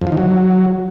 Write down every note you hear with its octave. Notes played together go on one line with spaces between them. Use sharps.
F2
F3
D#3
F#3